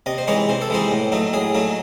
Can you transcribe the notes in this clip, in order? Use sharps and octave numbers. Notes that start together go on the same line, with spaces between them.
C3 D#5
C5
E3 G#3 D#4 C#5
C3 C5
A4
E3 G#3 D#4 C5
A2
F#3 A3 D#4
A2 G#4
F#3 A3 D#4